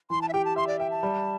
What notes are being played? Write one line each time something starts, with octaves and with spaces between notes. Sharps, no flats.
E3 C6
A5
E5
G4 G5
A5
E5 C6
D5
E5 G5
A5
G3